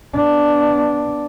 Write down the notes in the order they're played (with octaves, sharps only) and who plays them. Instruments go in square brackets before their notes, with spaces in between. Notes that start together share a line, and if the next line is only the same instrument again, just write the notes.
[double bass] B3 D4